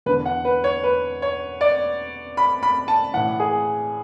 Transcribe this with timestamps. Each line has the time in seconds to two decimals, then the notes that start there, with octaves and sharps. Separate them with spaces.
0.06 E2 D3 B4
0.26 F#5
0.45 B4
0.64 C#5
0.83 B4
1.22 C#5
1.61 D5
2.37 B5
2.63 B5
2.88 A5
3.14 A2 E3 F#5
3.40 G#4